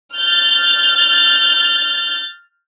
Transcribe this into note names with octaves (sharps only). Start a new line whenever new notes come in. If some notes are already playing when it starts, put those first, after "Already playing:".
F6 G6 A6